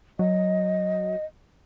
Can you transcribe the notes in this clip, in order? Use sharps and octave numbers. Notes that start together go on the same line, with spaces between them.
F#3 D#5